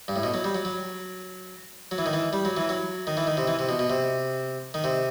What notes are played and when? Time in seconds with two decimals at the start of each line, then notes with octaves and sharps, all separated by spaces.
0.08 G2
0.16 A2
0.23 B2
0.34 F#3
0.44 G3
0.55 F#3
0.65 F#3
1.91 F#3
1.98 E3
2.06 D#3
2.13 E3
2.33 G3
2.45 F#3
2.57 E3
2.69 F#3
3.07 D#3
3.17 E3
3.27 D#3
3.37 C3
3.47 E3
3.59 C3
3.69 B2
3.79 B2
3.90 C3
4.74 D#3
4.84 C3